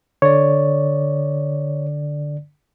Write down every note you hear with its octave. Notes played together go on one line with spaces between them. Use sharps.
D3 C#5 D5